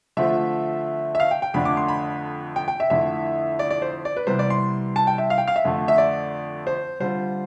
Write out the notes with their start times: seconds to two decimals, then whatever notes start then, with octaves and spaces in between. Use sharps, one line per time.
0.17 D3 F3 A3 C4 F4 E5
1.15 E5
1.20 F5
1.31 G5
1.42 G5
1.54 F2 D3 A3 D4 B5
1.65 D6
1.77 C6
1.88 B5
2.56 G5
2.68 G5
2.80 E5
2.90 F2 D3 A3 E4 E5
3.59 D5
3.71 D5
3.82 C5
4.05 D5
4.17 B4
4.27 C3 E3 G3 B3 C5
4.39 D5
4.50 C6
4.96 A5
5.07 G5
5.18 E5
5.30 F5
5.38 G5
5.48 F5
5.56 E5
5.65 F2 D3 A3
5.88 E5
5.98 D5
6.67 C5
7.00 D3 G3 C4 F4 C5